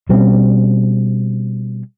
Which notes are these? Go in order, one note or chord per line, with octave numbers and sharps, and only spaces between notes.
B2 G3 C4 C#4